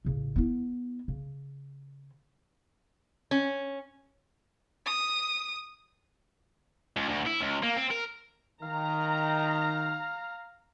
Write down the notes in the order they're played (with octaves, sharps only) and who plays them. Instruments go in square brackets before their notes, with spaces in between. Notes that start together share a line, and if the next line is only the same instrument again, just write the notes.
[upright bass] A1 C#3
B3 E4
C#3
[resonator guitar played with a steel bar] C#4
[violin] D#6
[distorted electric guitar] C#2
D2
E4
C#2
A#3
C4
A#4
[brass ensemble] D#3 [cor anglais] F5 [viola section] A#5